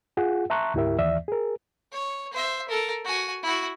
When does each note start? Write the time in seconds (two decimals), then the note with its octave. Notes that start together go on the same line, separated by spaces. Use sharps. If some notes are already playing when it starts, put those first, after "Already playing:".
0.17 F4 G#4 F#5
0.50 E5 A5 A#5 C6 C#6 F#6
0.74 D2 G#2 E4 G4 A#4 E5
0.98 D#2 E3 D5 E5
1.28 G#4 A#4
1.92 C#5
2.33 C5 E5
2.68 A4 A#4
3.05 F#4 G#5
3.43 E4 F#4